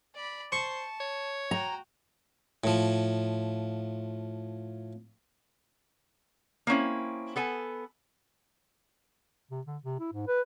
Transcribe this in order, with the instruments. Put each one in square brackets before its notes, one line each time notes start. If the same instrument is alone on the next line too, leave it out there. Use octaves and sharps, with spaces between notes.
[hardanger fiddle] D5 B5
[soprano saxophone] C5 [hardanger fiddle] A5 [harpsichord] C#6
[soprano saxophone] C#5
[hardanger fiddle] F#4 G5 [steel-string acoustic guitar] A#5
[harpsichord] A2 F3
[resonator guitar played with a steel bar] A#3 C4 C#4 E4
B3 A4 G#5
[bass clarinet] C3
D3
C3
E4
G#2
B4